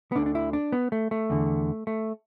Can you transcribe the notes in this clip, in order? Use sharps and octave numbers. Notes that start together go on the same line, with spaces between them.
B3
D2 D3 D4
D4
E4
D4
B3
A3
A3
E2 D3
A3